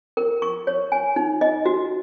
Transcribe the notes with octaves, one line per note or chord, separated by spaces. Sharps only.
A#4
C#6
C#5
G#5
D#4
D#5
F#4